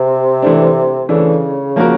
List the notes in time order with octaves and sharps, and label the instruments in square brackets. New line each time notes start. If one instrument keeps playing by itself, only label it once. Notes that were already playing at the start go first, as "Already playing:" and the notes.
Already playing: [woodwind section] C3
[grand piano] E3 A3 D4
[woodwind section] C#3 [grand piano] E3 A3 D4
[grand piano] F3 A#3 C#4 F#4 A#4